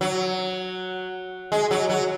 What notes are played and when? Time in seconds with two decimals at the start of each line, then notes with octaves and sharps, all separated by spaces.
0.01 F#3
1.52 G#3
1.71 F#3
1.90 F#3